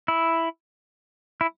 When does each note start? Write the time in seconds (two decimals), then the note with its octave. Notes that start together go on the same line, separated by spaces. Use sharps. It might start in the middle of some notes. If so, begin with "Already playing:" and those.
0.08 E4
1.41 E4